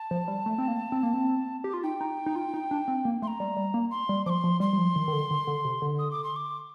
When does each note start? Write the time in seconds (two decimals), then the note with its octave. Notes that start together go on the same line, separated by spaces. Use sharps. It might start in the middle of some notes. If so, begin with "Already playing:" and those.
Already playing: A5
0.11 F3
0.28 G3
0.46 A3
0.58 C4
0.68 A#3
0.92 C4
1.03 A#3
1.13 C4
1.64 G4
1.74 F4
1.83 D#4 G5
2.01 D#4
2.26 D#4
2.36 F4
2.54 D#4
2.71 D4
2.88 C4
3.05 A#3
3.22 A3 C6
3.28 A#5
3.40 G3
3.56 G3
3.74 A#3
3.91 C6
4.09 G3
4.26 F3 D6
4.30 C6
4.44 F3
4.60 G3 C6
4.73 G3
4.78 F3
4.96 D#3
5.08 D#3
5.13 D3
5.30 D3
5.47 D3
5.64 C3
5.82 D3
5.99 D#6
6.11 D6
6.24 C6
6.36 D6